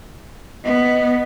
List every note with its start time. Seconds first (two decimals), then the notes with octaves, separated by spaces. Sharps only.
0.64 B3 D#5